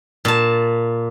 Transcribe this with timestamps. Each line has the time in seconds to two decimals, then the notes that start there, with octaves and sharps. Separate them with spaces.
0.25 A#2 A5